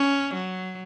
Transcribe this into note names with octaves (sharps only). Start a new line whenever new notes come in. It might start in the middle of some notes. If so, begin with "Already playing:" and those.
Already playing: C#4
F#3